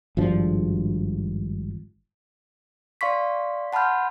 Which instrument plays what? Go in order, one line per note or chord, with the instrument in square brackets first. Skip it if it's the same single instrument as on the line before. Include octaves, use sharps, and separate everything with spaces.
[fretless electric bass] G#1 G2 F3 D4
[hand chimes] D5 F5 C6 C#6 B6
F#5 A5 B5 C6 F6 G6